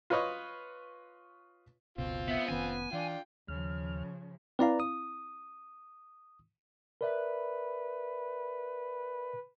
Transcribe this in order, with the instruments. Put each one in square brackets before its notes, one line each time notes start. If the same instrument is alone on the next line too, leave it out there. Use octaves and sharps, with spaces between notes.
[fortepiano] F4 B4 C#5 D#5
[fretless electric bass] F#1 C#2 B2 [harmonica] C4 F4
[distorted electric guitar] B3 [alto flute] E5
[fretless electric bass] F1 D#3 C#4 [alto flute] B3 [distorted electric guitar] G#5
[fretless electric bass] E3 [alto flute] D4 [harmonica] F4 G5
[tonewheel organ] D#2 F6 [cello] C#3 F3
[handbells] C4 E4 F5 [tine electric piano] B4 D5 A#5
[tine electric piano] D#6
[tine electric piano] A#4 D5 E5 [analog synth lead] B4